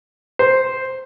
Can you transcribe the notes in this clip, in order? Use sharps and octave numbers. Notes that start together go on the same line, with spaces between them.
C5